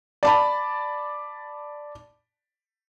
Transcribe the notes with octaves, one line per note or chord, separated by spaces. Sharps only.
D5 A5 B5